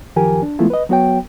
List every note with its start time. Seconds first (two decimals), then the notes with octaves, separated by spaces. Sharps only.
0.16 F#2 D#3 F3 G4 A#4 G#5
0.42 D4
0.59 E3 G#3 A3 B3 E4 F4
0.70 B4 D#5
0.89 F#3 B3 F#4 C#5 G5